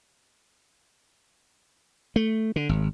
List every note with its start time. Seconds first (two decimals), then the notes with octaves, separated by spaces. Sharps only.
2.16 A3
2.56 D3
2.69 G#1